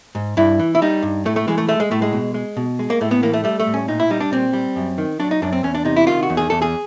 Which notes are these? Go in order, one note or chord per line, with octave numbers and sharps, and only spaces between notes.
G#2
G2 E4
E3
E4
G3 D#4
G2
A2 A3
A3
E3 G#3
A3
G#3 A3
G#3
A2 A3
G#3
B2
G#3
B2
G#3
A#3
A2 A3
B3
E3 A#3
A3
G3 A3
A3
A2
C#4
A#2 D#4
E4
G3 D#4
D4
A#2 C4
G3
F#2
D#3
F#3 D4
D#4
F#2 D4
C4
E2 C#4
D4
C3 D#4
E4
D#3 F4
F#4
E2
G#4
E2 A4
G#4